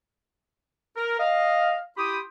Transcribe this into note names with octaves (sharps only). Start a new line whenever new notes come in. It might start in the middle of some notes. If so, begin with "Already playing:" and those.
A#4
D#5 F5
E4 G4 G5 B5 C6 D#6